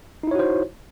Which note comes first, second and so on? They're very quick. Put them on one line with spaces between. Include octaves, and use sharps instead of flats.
D#4 E4 C#5 F#4 C5